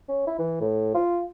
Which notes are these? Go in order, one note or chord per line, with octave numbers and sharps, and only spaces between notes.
C#4
E4
E3
A2
F4